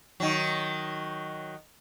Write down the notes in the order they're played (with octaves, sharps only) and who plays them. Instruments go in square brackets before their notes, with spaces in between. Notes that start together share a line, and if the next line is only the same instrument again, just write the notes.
[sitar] D#3 F#3